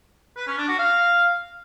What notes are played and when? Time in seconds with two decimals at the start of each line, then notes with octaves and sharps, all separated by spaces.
0.37 B4
0.47 C#4
0.58 D4
0.68 F#4
0.79 F5